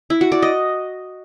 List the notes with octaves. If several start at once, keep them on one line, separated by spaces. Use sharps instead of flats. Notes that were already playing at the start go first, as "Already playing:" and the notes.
E4
F#4
D5
D#5